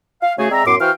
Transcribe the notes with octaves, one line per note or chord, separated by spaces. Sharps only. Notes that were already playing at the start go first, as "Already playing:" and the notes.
F5
C#3 A3 F#4 G#4
G#3 C4 D5 E5 A#5
F#2 A2 B3 C6 D6
E3 F#4 C5 F5 G5 F6